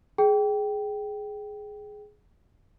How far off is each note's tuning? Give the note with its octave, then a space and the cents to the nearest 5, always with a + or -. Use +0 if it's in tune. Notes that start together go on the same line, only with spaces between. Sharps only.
G#4 +10 G5 -10